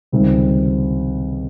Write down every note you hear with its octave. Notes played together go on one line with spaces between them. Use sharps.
C#2 C3 D#3 G3 C4